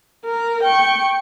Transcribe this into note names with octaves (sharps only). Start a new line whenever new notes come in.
A#4
G5 C#6